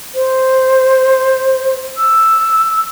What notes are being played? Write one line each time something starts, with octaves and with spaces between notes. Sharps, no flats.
C5
E6